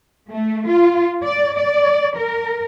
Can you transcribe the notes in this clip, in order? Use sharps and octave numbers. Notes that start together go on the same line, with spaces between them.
A3
F4
D5
D5
A#4